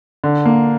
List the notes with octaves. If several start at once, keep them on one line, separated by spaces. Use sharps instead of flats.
D3
A#3